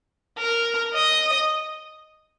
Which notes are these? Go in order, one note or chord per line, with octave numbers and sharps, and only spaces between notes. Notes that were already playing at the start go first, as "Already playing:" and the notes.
A#4
D#5